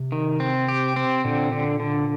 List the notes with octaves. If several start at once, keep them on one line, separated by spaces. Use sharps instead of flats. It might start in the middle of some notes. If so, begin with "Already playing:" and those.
Already playing: C3
D#3
C4
G4
C4
A#2 D3
D3
D3